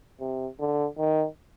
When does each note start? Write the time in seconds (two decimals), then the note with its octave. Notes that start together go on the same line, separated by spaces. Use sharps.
0.20 C3
0.59 D3
0.98 D#3